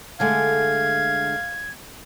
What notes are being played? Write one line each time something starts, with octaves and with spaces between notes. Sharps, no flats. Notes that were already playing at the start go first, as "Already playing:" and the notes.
D3 G#3 A3 F5 G#6